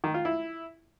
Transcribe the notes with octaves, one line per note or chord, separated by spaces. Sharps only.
D#3
F4
E4